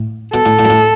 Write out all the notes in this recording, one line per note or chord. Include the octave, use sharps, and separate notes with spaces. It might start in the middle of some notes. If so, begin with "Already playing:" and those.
Already playing: A2
B2 A4
A2
A2
F#2
A2